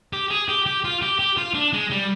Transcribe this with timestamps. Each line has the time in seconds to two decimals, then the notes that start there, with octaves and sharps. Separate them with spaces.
0.13 G4
0.31 G#4
0.48 G4
0.66 G4
0.84 F4
1.02 G4
1.19 G4
1.37 F4
1.54 D4
1.73 G#3
1.91 G3